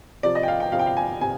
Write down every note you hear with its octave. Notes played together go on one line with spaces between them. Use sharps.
C3 F3 D5
D#5
G5
F5
G5
C3 F3 F5
G5
F5
G#5
C3 G#5